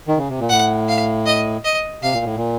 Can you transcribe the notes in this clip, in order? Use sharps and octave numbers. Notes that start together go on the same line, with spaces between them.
D#3
C#3
C3
A#2
A2 F#5
F5
D#5
D#5
C3 F5
A#2
A2
A#2